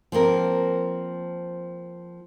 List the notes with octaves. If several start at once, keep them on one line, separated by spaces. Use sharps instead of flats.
F3 A#3 C4 A#4